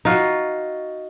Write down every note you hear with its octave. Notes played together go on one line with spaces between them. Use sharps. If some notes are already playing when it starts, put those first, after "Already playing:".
D#4 F4 F#4